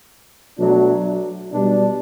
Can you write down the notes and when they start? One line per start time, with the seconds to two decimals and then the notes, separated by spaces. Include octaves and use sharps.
0.57 B2 F#3 A3 D4
1.52 B2 G3 D4